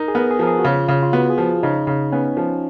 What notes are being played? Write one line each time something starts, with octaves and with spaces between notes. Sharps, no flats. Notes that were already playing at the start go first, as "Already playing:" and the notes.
Already playing: D#4 A#4
G#4
B3 A#4
G#4
F3 A#4
G#4
F#4
C#3 F4
C#3
F4
B3 F#4
G#4
F3
C#3 D#4
C#3
B3 C#4
F3